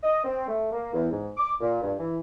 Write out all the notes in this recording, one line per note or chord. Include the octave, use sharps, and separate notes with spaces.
D#5
C4
A3
A#3
E2
G#2
D6
A#2
G2
E3